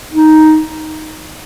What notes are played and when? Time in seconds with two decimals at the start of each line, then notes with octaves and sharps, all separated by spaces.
0.12 D#4